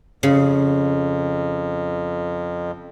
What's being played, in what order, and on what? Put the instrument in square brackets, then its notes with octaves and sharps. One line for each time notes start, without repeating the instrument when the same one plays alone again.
[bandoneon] F2 [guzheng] C#3